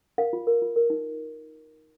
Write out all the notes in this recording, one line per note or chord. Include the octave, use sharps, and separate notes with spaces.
A#4 F5
F4
A#4
F4
A#4
D#4